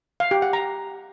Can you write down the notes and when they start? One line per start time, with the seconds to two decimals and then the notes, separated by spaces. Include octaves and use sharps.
0.20 F5
0.31 G4
0.42 F#5
0.53 A#5